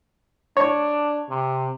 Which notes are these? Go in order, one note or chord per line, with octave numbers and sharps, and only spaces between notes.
D4 C#5
C3